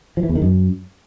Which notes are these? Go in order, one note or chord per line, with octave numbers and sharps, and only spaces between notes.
F3
E3
E2
D#3
F#2